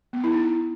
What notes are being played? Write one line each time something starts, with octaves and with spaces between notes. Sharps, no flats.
B3
E4
D#4